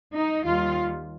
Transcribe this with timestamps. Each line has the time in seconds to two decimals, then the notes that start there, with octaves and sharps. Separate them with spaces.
0.14 D#4
0.44 D#2 D#3 G3 F4